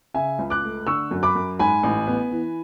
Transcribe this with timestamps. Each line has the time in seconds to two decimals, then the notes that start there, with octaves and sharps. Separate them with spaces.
0.14 C#3 E5 G#5
0.39 C#2
0.50 D6 F#6
0.63 A3
0.87 D3 C#6 E6
1.11 F#2
1.23 B5 D6
1.35 F#2
1.59 G#2 G#5 B5
1.83 A1
2.07 B3
2.31 E3